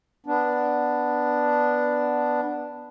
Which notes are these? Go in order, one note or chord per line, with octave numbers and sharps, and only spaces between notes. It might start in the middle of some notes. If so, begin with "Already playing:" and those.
B3 D4